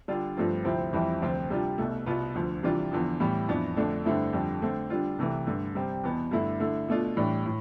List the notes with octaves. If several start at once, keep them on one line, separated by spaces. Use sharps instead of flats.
D3 G3 D4 F4
G2 F3 A3 C4 F4
D2 C3 F3 C4 E4
F2 E3 G3 C4 E4
D2 C3 F3 C4 F4
C3 G3 D4 F4
C2 B2 A3
C2 B2 B3 F4
D2 D3 F3
C3 E3 G3 D4 F4
E2 D3 F3
A2 E3 G3 B3
F2 E3 B3 D4 F4
F2 D3 A3 D4
G2 D3 A3 C4 E4
F2 D3 G3
D3 A3 C4
D3 G3 D4 F4
C2 C3 E3 A3
G2 D3 A3
C3 G3 C4
E2 B2 B3
G2 D3 A3 E4
D3 A3 E4
B2 A3 D4 F4
A2 E3 G3 D4
A2